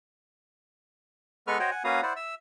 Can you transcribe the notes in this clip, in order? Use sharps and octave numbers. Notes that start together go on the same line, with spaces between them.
G#3 B3 A4 B4 C#6 F6
F#4 C5 C#5 D#5 F#5 G5
F#5 G#5
A#3 C#4 F#4 B4 F5 D#6
E4 C5 D5 F#5
E5 E6